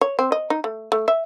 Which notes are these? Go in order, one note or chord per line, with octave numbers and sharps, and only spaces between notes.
C#5
C4
D#5
D#4
A3
A3
E5